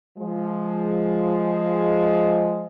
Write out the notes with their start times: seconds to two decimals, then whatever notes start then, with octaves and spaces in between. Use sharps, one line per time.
0.17 F3 G#3